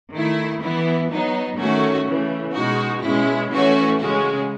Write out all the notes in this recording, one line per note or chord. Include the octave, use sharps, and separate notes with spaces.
D#3 A3 E4
E3 B3 E4
F#3 B3 D#4
D#3 A3 C#4 F#4
C#3 E3 A3
B2 G#3 D#4 F#4
B2 G#3 C#4 E4
E3 A3 C#4 F#4
C#3 G#3 C#4 F#4